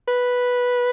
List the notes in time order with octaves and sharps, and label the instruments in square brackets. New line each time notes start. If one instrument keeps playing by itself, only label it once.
[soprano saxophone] B4